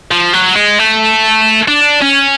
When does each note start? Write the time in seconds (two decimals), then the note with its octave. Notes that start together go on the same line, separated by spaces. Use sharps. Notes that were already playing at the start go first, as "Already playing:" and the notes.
0.11 F3
0.33 F#3
0.56 G#3
0.79 A3
1.68 D4
2.02 C#4